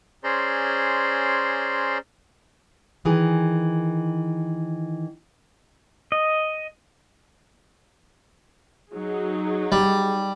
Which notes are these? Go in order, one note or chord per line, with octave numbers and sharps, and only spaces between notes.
C#4 G#4 C5 D5 A#5 C6
D#3 E3 G#4
D#5
F#3 D#4 G#4
G3